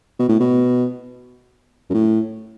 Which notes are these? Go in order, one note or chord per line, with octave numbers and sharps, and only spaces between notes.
B2
A2
B2
F#2
A2